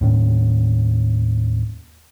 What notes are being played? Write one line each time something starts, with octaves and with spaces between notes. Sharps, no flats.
D#2 A2 C#4